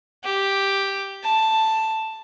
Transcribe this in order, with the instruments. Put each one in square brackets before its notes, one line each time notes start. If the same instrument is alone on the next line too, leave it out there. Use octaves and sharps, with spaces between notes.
[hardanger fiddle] G4
A5